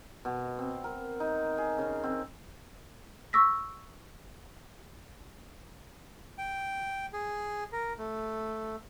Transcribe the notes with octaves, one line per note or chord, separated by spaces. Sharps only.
B2
C4
A#4
D#4
G#4
C#3
C4
C#6 D6 E6 A#6 B6
G5
G#4
A#4
A3